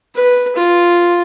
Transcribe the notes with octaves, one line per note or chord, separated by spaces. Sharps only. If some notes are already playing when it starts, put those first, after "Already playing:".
B4
F4